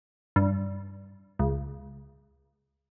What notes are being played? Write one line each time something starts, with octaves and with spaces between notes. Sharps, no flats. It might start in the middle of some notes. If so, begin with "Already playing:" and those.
G2
C#2